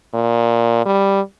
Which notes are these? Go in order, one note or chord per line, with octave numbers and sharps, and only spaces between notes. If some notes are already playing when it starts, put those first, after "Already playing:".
A#2
G3